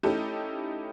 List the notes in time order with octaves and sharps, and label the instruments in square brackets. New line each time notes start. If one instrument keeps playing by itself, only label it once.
[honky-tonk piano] A3 C#4 D#4 E4 G4 A4